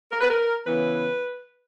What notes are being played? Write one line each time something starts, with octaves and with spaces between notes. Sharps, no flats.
A#4
B4
A#4
C#3 E3 B3 B4